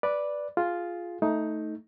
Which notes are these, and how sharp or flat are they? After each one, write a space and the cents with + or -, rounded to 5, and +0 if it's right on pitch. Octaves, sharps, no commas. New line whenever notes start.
B4 -5 D5 +0
F4 +0 G#4 +5
A3 +0 D#4 +10